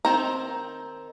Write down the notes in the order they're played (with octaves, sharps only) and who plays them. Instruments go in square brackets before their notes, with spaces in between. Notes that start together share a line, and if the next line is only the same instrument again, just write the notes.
[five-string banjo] D#3 C4 A#5